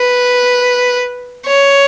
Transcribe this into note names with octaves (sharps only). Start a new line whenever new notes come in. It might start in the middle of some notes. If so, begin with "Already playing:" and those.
Already playing: B4
C#5